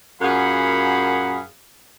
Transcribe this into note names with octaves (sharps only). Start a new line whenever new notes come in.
F#2 A#2 G#4 F5 F#5 B5